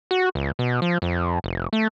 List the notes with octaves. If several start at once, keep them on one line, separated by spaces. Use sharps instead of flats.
F#4
C#2
B2
F3
F2
F1
A3